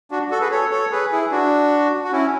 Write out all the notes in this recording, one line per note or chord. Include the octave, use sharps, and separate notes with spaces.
D4 F#4
F#4 A4
G#4 B4
A4 C#5
A4 C#5
G#4 B4
E4 G#4
D4 F#4
F#4
C#4 E4